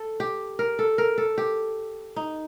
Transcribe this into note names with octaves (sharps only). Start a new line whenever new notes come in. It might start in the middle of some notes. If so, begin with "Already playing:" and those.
Already playing: A4
G4
A#4
A4
A#4
A4
G4
D#4